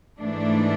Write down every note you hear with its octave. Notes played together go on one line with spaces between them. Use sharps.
G#2 E3 A3 D4